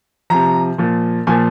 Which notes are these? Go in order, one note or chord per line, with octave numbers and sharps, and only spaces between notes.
C3 F3 A#5
A#2 F3
A#2 F3 G#5